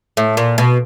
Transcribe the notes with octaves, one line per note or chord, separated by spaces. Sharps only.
A2
A#2
B2